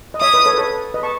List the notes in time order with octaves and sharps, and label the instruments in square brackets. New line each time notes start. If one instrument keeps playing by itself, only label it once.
[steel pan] D#5
[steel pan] C#5 E5 [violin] D#6
[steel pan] B4 D#5
A4 C#5
B4
A4 C#5
B4 D#5
A5 C#6